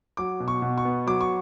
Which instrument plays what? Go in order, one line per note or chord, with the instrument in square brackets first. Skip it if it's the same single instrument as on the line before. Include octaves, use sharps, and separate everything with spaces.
[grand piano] F#3 D6
B2
C#6
B2
C#6
B3
F#3 D6
C#6